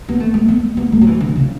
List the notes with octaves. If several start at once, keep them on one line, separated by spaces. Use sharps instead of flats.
B3
A3
A3
B3
B3
A3
F#3
E3
D3
C#3